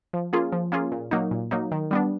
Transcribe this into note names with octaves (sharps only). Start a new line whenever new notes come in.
F3
A#3 C#4 F4 G#4
F3
A#3 C#4 F4 G#4
A#2
F#3 A#3 D#4
A#2
F#3 A#3 D#4
D#3
G3 B3 D4